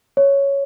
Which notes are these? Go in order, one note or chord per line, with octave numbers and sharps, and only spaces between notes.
C#5